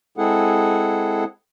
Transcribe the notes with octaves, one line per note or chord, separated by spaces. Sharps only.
G#3 C4 E4 G#4 A4 F#5